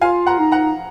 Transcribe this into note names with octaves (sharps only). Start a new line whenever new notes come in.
F4 F5 G#5
F#5 A#5
D#4
F#5 A#5